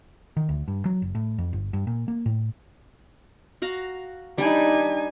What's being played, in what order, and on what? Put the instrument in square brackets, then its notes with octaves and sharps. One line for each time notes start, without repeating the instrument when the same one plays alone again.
[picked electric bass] D#3
D2
G2
F#3
F#1
A2
F2
G1
G2
A#2
A#3
A2
[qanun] F#4 F5 A#5
[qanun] G3 D4 D6 [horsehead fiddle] D#4 G#5